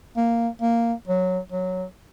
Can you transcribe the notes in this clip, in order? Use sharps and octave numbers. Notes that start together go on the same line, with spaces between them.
A#3
A#3
F#3
F#3